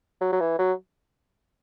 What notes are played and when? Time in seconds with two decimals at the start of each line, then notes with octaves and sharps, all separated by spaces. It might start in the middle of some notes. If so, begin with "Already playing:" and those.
0.21 F#3
0.32 F#3
0.40 E3
0.59 F#3